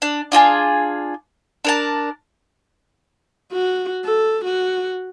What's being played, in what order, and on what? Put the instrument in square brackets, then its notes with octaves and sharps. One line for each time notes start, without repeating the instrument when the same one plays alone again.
[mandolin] D4
D4 F4 F#4 G#4
D4 A#4 A5
[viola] F#4
A4
F#4